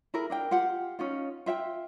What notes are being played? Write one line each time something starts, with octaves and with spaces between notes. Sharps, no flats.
E4 G#4 A#4
D4 A#4 G5
F4 G4 F#5
C#4 D#4 F4
F4 E5 F5 G5